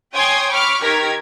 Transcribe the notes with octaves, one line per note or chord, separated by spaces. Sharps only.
C#5 G5 G#5 C6 D#6 G#6
B5 C#6 D6 F6
D#3 G4 A#4 G#6 B6